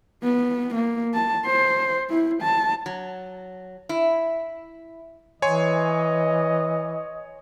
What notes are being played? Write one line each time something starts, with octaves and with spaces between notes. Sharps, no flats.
B3
A#3
A5
C5
E4
A5
F#3
E4
E3 C#5 D#5 G#5 C6